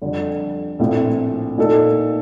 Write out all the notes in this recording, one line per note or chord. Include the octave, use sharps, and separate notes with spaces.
F2 D3 G3
A#1 A2 A3 C4 F4
A#2 A3 D#4 A4